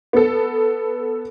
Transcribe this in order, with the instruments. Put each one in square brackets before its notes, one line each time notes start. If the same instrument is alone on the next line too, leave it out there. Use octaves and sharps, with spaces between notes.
[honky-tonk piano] B3 A4